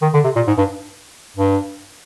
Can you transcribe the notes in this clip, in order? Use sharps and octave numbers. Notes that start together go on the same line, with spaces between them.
D#3
D3
C3
A#2
G#2
G2
G2